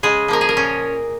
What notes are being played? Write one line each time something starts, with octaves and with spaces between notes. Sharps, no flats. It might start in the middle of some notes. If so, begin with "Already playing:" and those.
C#3 G#3 G#4
F3 A#3 A#4
G#4
A#4
A#2 C#4